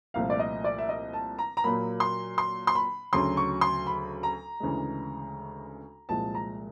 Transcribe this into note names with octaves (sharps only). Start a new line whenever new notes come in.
C2 A#2 F3 A3 F5
D5
D#5
D5
E5
D#5
A5
A#5
A#5
A#2 F#3 A#3 B5
C6
C6
C6
B5
D2 C#3 F#3 C6
C#6
C6
B5
A#5
D2 C#3 E3 G#3
C2 A#2 F3 G#3 A5
A#5